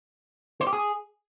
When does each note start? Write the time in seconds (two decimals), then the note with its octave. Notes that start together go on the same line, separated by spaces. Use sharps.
0.61 C5
0.67 G4
0.73 G#4